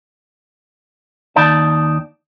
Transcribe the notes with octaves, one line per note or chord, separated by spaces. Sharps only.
D#2 D#4 D5 A5